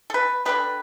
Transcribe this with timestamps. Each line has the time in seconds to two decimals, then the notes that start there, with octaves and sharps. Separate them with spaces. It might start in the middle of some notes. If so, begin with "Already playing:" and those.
0.10 A4
0.14 B4
0.45 D3 G3 B3 B4